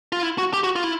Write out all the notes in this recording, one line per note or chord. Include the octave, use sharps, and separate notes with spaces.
F4
E4
F#4
G4
F#4
F4
E4